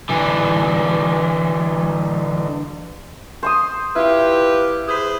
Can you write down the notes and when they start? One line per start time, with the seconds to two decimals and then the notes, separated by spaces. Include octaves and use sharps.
0.09 D3 E3
3.43 C5 C6 D#6
3.96 E4 F4 G4 B4
4.88 G#4 B4 C5